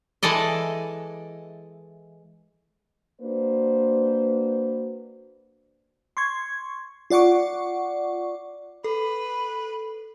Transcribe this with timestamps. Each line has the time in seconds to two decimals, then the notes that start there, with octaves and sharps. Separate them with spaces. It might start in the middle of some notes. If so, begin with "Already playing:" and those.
0.23 E3 G#3 A4 D5 D#5
3.21 A#3 D4 F#4 B4 C5
6.17 C6 C#6 G#6
7.10 F4 D5 F#5 C#6 D6
8.84 A4 B4